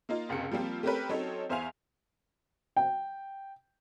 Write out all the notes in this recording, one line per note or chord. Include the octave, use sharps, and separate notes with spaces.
A#3 D#4 F4
F#1 C#2 C3 C#7
F3 G3 A#3 C4 F4
A3 C4 C#4 G4 A#4 B4
F#3 C4 C#4 D#4 A4 C#5
E2 C5 E5 F5 G#5 F7
G5